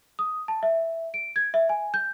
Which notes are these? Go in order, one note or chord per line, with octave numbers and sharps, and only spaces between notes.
D#6
A5
E5
D7
G#6
E5
G#5
G6